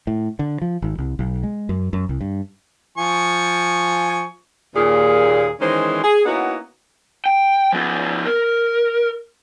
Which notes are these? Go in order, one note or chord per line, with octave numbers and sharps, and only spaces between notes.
A2
D3
F3
G#1
C2
B1
G#3
F#2
F#2
C2
G2
F3 G#5 C#6
D#2 A#2 G#4
D#3 E3 G#3 C#4 C5
G#4
A#3 B3 C#4 D#4 E4 F#4
G5
F3 B3
A#4